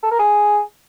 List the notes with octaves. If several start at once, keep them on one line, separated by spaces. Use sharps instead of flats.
A4
A#4
G#4